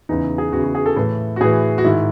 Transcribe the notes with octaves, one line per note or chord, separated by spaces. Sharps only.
E2 C#3 E3 D#4
G#4
E2 C#3 E3 F#4
F#4
G#4
A4
A2 E3 A4
F#4
A2 E3 G#4
F#4
G#2 D#3 E4